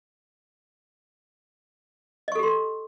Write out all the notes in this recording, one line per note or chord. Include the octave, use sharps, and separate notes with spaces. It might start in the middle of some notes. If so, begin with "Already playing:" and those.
G4 A4 D#5 C6 C#6